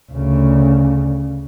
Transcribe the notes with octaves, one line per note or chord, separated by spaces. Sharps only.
D2 C#3